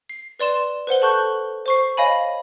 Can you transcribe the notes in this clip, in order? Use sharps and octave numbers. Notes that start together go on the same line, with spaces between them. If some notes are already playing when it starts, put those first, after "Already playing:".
C7
B4 D5 C6 E7
B4 C5 F#5 G7
A4 A5 C#6 F#6 G6
C5 C#6 C7
C#5 D#5 F5 G#5 B5